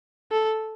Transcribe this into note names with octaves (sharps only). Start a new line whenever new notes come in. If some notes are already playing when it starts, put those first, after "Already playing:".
A4